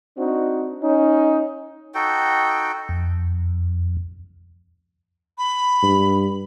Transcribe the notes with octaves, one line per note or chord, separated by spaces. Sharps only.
C4 D4 D#4 F#4
C#4 D#4
D#4 F#4 A4 G5
F2
B5
G2